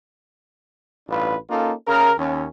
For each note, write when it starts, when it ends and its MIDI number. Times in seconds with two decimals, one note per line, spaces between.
1.09 1.35 33
1.09 1.35 43
1.09 1.35 62
1.09 1.35 65
1.09 1.35 71
1.50 1.73 58
1.50 1.73 61
1.50 1.73 63
1.50 1.73 65
1.50 1.73 69
1.88 2.12 49
1.88 2.12 70
2.18 2.46 39
2.18 2.46 61